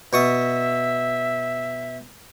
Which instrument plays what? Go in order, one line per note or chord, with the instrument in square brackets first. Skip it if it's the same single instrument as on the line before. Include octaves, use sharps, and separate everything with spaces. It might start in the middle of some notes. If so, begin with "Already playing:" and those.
[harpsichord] B2 C#6 D#6 [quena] E5